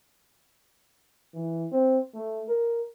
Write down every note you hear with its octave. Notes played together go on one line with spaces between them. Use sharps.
E3
C4
A3
A#4